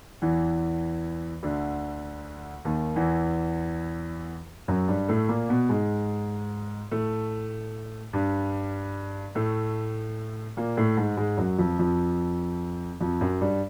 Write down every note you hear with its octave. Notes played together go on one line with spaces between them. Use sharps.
E2 E3
D2 D3
D#2 D#3
E2 E3
F#2 F#3
G2 G3
A2 A3
A#2 A#3
B2 B3
G#2 G#3
A2 A3
G2 G3
A2 A3
A#2 A#3
A2 A3
G#2 G#3
G#2 G#3
F#2 F#3
F2 F3
F2 F3
F2 F3
F#2 F#3
G2 G3